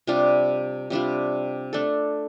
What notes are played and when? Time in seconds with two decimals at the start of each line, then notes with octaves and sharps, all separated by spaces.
0.07 C3 G3 D4 F4
0.90 C3 G3 D4 F4
1.73 A3 D4 A4